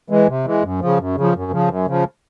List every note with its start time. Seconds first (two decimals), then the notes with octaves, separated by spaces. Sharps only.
0.10 E3 G#3
0.28 C3
0.45 E3 G#3
0.63 F#2
0.81 C#3 F3
0.98 F#2
1.16 C#3 F3
1.34 F#2
1.51 C#3 F3
1.69 F#2
1.87 C#3 F3